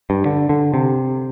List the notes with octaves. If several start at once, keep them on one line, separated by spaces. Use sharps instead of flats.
G2
D3
D3
C3